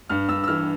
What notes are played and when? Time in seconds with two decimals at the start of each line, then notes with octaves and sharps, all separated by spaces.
0.09 G2 F6
0.29 G2 E6
0.44 E6
0.48 E3 F6